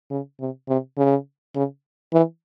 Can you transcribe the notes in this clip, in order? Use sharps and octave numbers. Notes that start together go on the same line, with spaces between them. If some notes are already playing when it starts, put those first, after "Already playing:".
C#3
C3
C3
C#3
C#3
E3